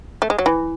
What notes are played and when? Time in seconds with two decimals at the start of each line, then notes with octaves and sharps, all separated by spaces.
0.22 A3
0.30 G#3
0.39 F#3
0.46 E3